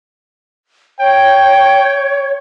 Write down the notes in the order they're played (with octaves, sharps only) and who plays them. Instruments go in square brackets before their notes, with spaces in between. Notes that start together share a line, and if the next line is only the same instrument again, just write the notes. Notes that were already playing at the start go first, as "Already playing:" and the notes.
[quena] C#5 [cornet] G5